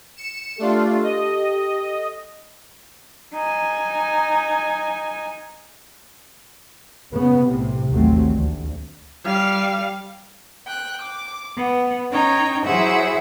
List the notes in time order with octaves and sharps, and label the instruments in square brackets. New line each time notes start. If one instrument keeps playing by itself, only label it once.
[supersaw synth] C#7 E7
[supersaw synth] A3 D4 F4 [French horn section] G4 A4
[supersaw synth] D#5
[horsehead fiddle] D#4 G#5
[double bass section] C#3 B3
B1 A2 C3
A1 D#2 C3 F#3 A3 C4
D2
[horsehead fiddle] G3 F5
[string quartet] G5 F#6
D6
B3
C#4 D#4 C#5 G5 A#5
F#3 E4 G#4 C5 E5 F#5